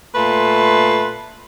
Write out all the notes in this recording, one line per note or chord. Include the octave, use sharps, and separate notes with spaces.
A#2 A3 B4 A5 C6